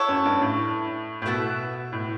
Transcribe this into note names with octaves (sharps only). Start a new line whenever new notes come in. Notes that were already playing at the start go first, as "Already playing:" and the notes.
Already playing: E4 A4 C#5 F#5
F#2
G2
A2
A2
B2 B3 E4 B4 E5
A2